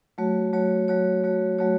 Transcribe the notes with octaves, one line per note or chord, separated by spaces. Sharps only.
F#3 A3 F#4 C#5
F#3 A3 F#4 C#5
F#3 A3 F#4 C#5
F#3 A3 F#4 C#5
F#3 A3 F#4 C#5